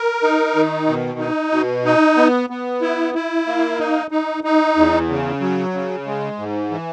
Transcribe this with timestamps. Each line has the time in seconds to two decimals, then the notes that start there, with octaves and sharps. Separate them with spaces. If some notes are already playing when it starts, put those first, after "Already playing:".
Already playing: A#4
0.23 D#4
0.56 D#3
0.88 B2
1.19 D#4
1.52 B2
1.85 D#4
2.17 B3
2.50 B3
2.82 E4
3.14 E4
3.47 A#3
3.79 D#4
4.11 D#4
4.44 D#4
4.77 E2
5.09 C#3
5.41 F#3
5.74 C#3
6.06 G#3
6.38 G#2
6.71 E3